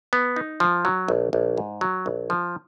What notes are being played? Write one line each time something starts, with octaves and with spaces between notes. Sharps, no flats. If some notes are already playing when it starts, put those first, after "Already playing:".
B3
D#4
F3
F#3
A#1
A#1
G#2
F#3
A#1
F3